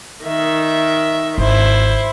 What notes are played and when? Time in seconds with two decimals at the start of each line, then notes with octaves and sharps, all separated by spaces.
0.25 D#3 E5
1.38 G#1 E4 C5